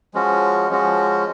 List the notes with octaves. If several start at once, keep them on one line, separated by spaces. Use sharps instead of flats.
F3 G#3 C#4 F#4
F3 G#3 C#4 F#4